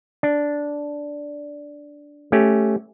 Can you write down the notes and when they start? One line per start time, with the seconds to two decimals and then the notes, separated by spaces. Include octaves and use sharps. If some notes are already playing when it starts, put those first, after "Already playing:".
0.23 D4
2.32 A3 C#4 G4